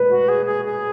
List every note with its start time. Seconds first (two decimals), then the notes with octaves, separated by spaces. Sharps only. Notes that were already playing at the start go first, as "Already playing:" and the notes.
Already playing: B4
0.09 F#4
0.29 G#4
0.46 G#4
0.65 G#4